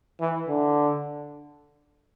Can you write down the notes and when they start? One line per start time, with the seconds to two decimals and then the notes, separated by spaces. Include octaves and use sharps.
0.20 E3
0.48 D3